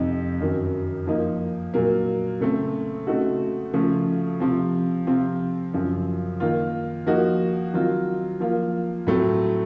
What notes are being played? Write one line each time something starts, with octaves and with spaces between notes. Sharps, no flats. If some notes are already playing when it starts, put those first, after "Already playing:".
Already playing: F2 C3 F3 C4 D#4
F#2 D#3 F#3
F3 A#3 D#4
A#2 F#3 A#3
C#3 A3 C4
C#3 A3 C4 D#4 F#4
C#3 F3 A3
C3 F3 C4
C3 F3 C4 F4
F#2 C#3 F3 C4
D#3 A#3 F4
F3 A#3 D#4 F#4
D#3 F#3 C4 F4
F3 A#3 F4
A2 F#3 A3 C4